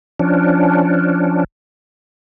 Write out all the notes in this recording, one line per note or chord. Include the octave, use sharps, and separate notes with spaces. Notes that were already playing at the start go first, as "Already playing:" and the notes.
F3 C#4 D4